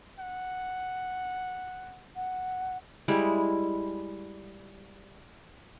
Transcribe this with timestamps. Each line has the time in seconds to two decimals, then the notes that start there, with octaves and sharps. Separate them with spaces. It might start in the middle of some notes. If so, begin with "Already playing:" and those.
0.19 F#5
2.16 F#5
3.08 G3 G#3 E4